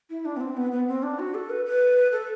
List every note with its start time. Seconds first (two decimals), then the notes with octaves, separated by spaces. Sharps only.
0.10 E4
0.25 D4
0.37 B3
0.40 C4
0.57 B3
0.72 B3
0.88 C4
1.03 D4
1.19 F#4
1.35 A4
1.50 B4
1.65 B4
2.12 A4